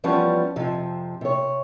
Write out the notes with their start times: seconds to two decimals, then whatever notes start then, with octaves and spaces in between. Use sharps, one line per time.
0.04 E3 F3 G3 B3 C#4
0.56 F2 C3 F3
1.21 C3 C#5